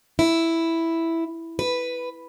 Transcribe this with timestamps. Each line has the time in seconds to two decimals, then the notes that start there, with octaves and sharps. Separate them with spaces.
0.19 E4
1.59 B4